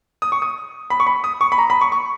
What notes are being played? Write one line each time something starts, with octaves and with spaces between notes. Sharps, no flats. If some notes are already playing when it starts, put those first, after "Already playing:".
D#6
C#6
D#6
B5
C#6
B5
D#6
C#6
B5
A#5
B5
C#6
C#6